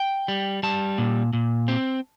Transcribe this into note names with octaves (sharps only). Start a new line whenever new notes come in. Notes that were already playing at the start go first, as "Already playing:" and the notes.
Already playing: G5
G3
G3 A5
A#2
A#2
C4